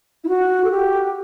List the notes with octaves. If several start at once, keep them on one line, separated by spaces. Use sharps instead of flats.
E4
F#4
A4
G4